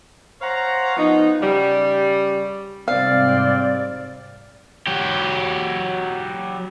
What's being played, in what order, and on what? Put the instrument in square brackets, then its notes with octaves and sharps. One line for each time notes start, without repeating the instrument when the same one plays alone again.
[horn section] C5 C#5 F5 F#5 A#5
F3 B3 D#4
C#3 G3
[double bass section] G#2 C3 G3 [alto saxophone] C4 [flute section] D5 [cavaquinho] F5
[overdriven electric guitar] F#3 G4